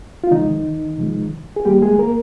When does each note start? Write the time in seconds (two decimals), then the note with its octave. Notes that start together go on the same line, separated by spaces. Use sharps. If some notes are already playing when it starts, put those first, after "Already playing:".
0.24 F4
0.31 C3 D#3 F3 G#3 D#4
0.98 C3 F3 G#3
1.56 G#4
1.65 D#3 G3 A#3 G4
1.82 G#3 G#4
1.99 A#3 A#4